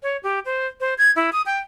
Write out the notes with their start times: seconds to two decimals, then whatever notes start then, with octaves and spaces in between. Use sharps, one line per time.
0.03 C#5
0.23 G4
0.45 C5
0.80 C5
0.98 G#6
1.16 E4
1.33 D#6
1.46 G5